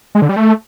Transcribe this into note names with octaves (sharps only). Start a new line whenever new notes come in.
G#3
D3
G3
A3